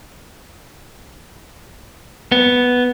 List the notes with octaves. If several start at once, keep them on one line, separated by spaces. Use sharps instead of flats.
B3